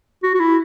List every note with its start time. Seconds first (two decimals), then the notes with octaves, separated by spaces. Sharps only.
0.23 F#4
0.34 F#4
0.40 E4